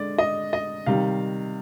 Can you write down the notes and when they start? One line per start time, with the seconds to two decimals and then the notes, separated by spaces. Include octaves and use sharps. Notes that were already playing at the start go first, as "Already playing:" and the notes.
Already playing: D3 G#3 D5
0.18 D#5
0.53 D#5
0.86 C3 D#3 G3 F5